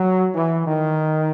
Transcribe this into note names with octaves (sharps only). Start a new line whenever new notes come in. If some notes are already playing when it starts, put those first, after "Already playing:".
Already playing: F#3
E3
D#3